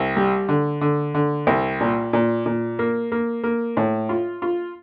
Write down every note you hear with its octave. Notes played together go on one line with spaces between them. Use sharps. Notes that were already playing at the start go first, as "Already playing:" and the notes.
Already playing: C2
G3
D3
D3
D3
C2
A#2
A#2
A#2
A#3
A#3
A#3
A2
F4
F4